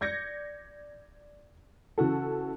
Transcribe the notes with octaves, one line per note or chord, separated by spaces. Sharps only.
D5 G6 G#6 A#6 C#7
C#3 E3 F#4 A4